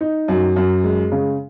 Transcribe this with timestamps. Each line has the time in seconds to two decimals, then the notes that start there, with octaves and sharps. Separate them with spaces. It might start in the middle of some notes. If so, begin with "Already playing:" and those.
0.01 D#4
0.28 F#2
0.56 F#2
0.84 G#3
1.12 C#3